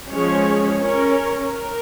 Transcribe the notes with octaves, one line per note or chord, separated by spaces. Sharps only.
F3 G#3 C#4 G#4 C#5
C#4 A#4 C#5
A#4